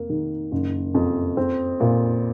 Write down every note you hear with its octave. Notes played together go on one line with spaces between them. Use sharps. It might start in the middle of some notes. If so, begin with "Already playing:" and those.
Already playing: F1 A#3
D#3
F#1
F2
C4
A#2